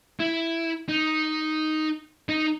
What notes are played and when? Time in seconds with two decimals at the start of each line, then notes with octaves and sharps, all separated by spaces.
0.19 E4
0.89 D#4
2.29 D#4